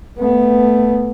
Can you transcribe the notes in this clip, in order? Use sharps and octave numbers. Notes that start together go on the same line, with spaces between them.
A3 B3